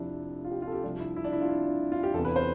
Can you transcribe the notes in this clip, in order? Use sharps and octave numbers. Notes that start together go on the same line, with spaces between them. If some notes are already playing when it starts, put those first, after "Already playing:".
Already playing: F1 F2 C3 F3 D4 E4
F4
G4
F4
A4
G4
C2 C3 F3 D4
E4
E4
D4
E4
F4
E4
D4
F4
G4
E2 C3 E3 A4
B4
C5